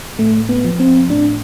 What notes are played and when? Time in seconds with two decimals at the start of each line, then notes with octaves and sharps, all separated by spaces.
0.19 A2 A3
0.49 B3
0.64 F3
0.80 C4
1.09 A2 D4